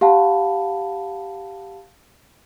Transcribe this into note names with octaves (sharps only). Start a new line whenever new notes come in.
G4 F5 F#5 A5 B5